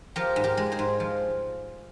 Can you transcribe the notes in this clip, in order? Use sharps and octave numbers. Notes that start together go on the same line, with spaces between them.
F3 G4 A#4
G#2
G4 A#4
G#3
G#4 C5
G#2
F3